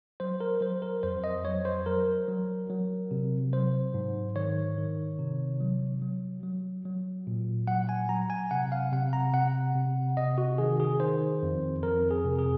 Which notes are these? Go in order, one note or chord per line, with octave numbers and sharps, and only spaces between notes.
F#3 C5
A#4
F#3 C5
A#4
F2 C5
D#5
F#3 C#5
C5
F#3 A#4
F#3
F#3
C3
F#3 C5
G#2
D#3 C#5
D#3
C3
F#3
F#3
F#3
F#3
A#2
F#3 F#5
G#5
F#3 A#5
G#5
C3 F#5
F5
C3 F#5
A#5
C3 F#5
C3
C3 D#5
F#4
D#3 G#4
G#4
D#3 C5
F2
F2 A#4
G#4
C3
G#4